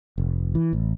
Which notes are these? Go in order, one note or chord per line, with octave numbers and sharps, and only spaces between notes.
F1
E3
A1